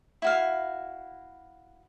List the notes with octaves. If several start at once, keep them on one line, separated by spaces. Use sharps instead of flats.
E4 F#4 F5